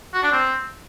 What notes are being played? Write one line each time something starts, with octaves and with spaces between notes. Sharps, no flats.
F#4
D4
C4